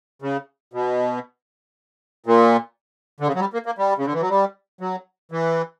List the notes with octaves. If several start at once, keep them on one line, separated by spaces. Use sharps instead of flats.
C#3
B2
A#2
D3
C#3
F#3
G3
A#3
A#3
G3
C#3
D3
E3
F#3
G3
F#3
E3